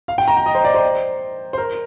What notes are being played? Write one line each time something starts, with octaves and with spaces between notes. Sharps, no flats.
F5
G5
A#5
G5
D#5
C5
D5
C5
C5
A#4